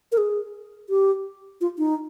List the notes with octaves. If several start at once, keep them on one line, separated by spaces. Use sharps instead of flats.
A#4
G#4
G4
F4
D#4